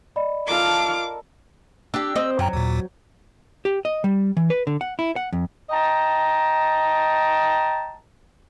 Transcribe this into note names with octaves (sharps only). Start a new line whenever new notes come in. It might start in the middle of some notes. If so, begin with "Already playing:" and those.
D5 D#5 B5
F4 A4 A#4 F5 D6
D4 G4 E6
C4 D#5
F#2 F#3 G5 A#5
D#2 A#2
G4
D#5
G3
E3
B4
D3
F#5
E4
F#5
F2
D#5 G5 A5 A#5